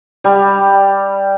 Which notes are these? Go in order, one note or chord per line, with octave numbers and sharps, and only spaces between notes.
G3